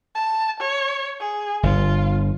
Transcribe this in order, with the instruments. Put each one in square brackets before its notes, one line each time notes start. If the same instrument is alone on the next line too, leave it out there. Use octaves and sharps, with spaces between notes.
[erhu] A5
C#5
G#4
[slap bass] G1 [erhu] F4